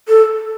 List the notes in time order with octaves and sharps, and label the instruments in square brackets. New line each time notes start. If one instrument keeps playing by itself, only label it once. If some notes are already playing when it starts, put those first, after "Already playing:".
[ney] A4